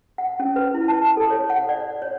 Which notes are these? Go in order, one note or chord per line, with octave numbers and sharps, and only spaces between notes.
F#5
C#4
B4
E4
A5
A4
C#5
F#5
D5
C#5